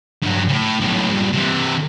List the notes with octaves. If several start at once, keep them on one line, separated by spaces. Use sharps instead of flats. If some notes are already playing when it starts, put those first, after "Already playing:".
G2 F#3
A2 C#3
B1 A2
G2 A#2
C3 E3